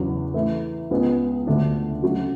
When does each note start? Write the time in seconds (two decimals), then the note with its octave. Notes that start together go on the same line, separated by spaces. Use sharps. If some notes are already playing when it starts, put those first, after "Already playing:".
Already playing: E2 C#3 F#3
0.34 E3 A3 E4
0.91 C#2 C#3 G#3 B3
1.47 D2 D3 A3 D4
2.02 F#3 A3 C#4 F#4